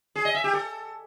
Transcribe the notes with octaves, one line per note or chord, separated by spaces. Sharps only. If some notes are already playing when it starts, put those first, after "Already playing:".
G#4
D#5
E5
G4
A4